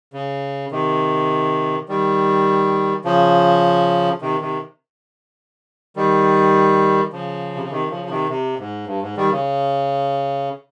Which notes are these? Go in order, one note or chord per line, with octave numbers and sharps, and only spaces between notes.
C#3
C3 D#3
D#3 G3
C#3 F3
C3 D#3
C3 D#3
D#3 G3
C#3 F3
C3
C#3
C3 D#3
C#3 F3
F3
C3 D#3
C3
G#2
G2
G#2
D#3 G3
C#3